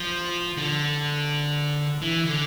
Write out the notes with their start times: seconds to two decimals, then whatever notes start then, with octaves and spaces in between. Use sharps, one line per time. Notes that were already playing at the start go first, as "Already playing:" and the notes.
Already playing: F3
0.57 D3
2.02 E3
2.26 D3